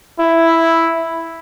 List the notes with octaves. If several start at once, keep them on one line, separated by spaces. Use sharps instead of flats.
E4